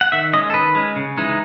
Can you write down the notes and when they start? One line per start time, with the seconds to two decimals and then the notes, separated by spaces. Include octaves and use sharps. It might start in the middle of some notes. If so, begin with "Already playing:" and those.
0.01 F#5
0.12 D#3 E5
0.33 G#3 C#4 D#5
0.50 A4
0.54 D#3 B4
0.75 G#3 C#4
0.96 C#3
1.18 E3 G#3 D#4